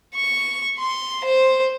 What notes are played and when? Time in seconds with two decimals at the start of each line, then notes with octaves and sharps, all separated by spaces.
0.16 C#6
0.78 C6
1.25 C5